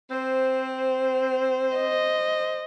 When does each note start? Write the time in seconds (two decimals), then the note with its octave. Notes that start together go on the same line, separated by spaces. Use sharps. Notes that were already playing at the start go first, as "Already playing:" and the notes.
0.11 C4 C5
1.76 D#5